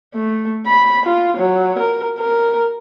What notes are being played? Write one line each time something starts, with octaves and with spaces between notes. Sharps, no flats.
A3
B5
F4
F#3
A#4
A#4